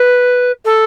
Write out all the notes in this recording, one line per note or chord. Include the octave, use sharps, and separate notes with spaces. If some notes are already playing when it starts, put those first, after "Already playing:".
Already playing: B4
A4